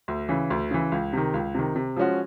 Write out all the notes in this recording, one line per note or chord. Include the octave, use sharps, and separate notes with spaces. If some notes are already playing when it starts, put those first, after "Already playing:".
D2
C#3 E3
D2
C#3 E3
C#2
C3 D#3
C#2
C3 D#3
C3
F3 G#3 C#4 F#4